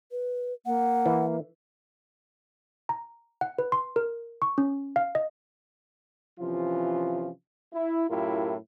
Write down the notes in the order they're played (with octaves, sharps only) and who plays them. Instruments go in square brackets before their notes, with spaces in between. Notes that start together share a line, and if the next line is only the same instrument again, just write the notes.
[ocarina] B4
[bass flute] A#3 [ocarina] F#5
[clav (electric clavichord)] E3
[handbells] A#5
F#5
B4
C6
A#4
C#6
C#4
F5
D#5
[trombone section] C3 E3 F3 C#4 F4
E4
F#2 A2 E4 F4 G4 A#4